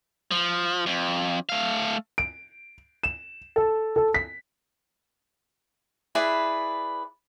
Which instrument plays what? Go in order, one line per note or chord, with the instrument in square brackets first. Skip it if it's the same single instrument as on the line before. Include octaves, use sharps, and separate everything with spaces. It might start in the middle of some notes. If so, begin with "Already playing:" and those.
[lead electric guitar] F3
F2
A3 F5
[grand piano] D7
E7
A4
A4
B6
[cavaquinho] E4 G#4 B4 D5